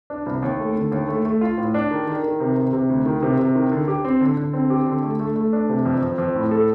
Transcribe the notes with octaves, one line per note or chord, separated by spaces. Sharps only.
D4
C2
D#2
A3
D3
D#2
A3
A3
F4
A2
D4
D#3
D#3
D#3
C3
C3
C3
D2
D#3
C3
C3
D#3
D3
G4
C4
D3
D3
C4
G4
D3
A3
A3
A3
D4
C3
F2
F2
F2
A2
A4